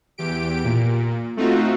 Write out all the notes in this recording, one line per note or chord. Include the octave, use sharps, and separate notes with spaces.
E2 G4 D7
A#2
A3 C4 D#4 F4 F#4